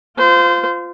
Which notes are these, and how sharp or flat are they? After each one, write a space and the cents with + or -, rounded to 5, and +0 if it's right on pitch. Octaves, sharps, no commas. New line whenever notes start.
F4 +0 C5 -25